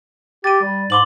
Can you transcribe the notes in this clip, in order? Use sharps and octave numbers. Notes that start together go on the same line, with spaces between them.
G4 A6 D#7
G3
G#2 C6 D6 F#7